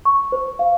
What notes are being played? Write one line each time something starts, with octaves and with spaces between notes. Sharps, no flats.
C#6
C5
F5